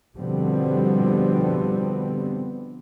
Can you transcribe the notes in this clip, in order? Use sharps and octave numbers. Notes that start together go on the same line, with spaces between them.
B2 D3 F3 G3 B3 C4